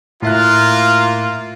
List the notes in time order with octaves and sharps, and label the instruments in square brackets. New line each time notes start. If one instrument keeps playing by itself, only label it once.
[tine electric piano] A2 E5 F#6 [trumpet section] A#3 F4